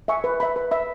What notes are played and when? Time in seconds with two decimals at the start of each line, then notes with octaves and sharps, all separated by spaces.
0.08 E5 G#5 C#6
0.24 B4
0.40 E5 B5
0.56 B4
0.71 E5 B5